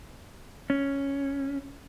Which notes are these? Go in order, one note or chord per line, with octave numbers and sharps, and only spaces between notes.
C#4